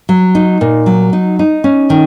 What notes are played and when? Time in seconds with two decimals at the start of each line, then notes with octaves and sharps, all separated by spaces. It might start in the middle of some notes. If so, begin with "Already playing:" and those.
0.09 F#3
0.35 D#4
0.61 A#2
0.86 F#3
1.13 D#4
1.39 D#4
1.64 C#4
1.90 D#3